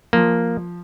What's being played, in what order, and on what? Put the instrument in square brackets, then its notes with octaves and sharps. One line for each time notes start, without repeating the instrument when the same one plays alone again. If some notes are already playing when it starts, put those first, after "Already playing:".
[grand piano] F3 [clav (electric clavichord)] A#3